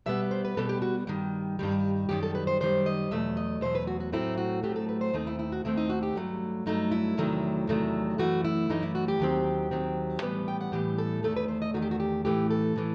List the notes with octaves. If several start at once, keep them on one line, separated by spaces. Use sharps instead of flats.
B2 G3 B3 E5
C5
B4
B2 G3 B3 A4
G4
F#4
G2 D#3 G3
G2 D#3 G3
F#2 D#3 G3 G4
A4
B4
C5
F#2 D#3 G3 C5
D#5
E2 B2 F#3 A3 E5
D#5
E2 B2 F#3 A3 C5
B4
F#4
F#4
A2 F#3 A3 C4 E4
F#4
A2 F#3 A3 C4 G4
A4
B4
C5
D#2 D#3 A3 C4 D#4
E4
E4
F#4
D#2 D#3 A3 C4 E4
D#4
F#4
G4
G2 F#3 A3
G2 F#3 A3 D#4
E4
E2 C3 D#3 F#3 A3
E2 C3 D#3 F#3 A3
F#2 E3 A3 F#4
E4
F#2 E3 A3 D#4
E4
F#4
G4
D#2 D#3 F#3 C4
D#2 D#3 F#3 C4
A2 E3 G3 B3 B4
G5
F#5
A2 E3 G3 B3 G4
A4
E2 D#3 A3 A4
B4
C5
D#5
E2 D#3 A3 F#4
G4
F#4
G4
A2 E3 A3 G4
A4
A2 E3 A3